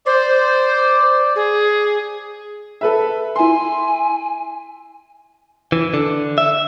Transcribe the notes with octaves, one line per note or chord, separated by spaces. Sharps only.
C5 D5
G#4
A4 B4 E5
E4 G#5 C6
E3
D3
E5